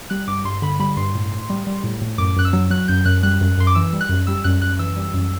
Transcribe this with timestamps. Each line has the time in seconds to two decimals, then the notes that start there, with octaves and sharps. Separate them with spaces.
0.10 G3 F#6
0.27 G2 D6
0.45 G2 C6
0.62 D3 B5
0.79 G3 B5
0.97 G2 C6
1.15 A2
1.32 A2
1.50 G3
1.67 G3
1.84 A2
2.01 A2
2.18 F#2 D6
2.37 F#2 F#6
2.45 E6
2.53 F#3
2.70 F#3 F#6
2.88 F#2 G6
3.05 F#2 F#6
3.23 G3 F#6
3.41 F#2
3.58 F#2 C6
3.67 D6
3.75 E3 E6
3.93 G3
4.01 F#6
4.09 F#2
4.27 G3 E6
4.44 F#2 F#6
4.62 F#2 F#6
4.79 E3 E6
4.97 G3
5.14 F#2